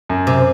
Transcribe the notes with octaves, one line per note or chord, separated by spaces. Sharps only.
F#2
C3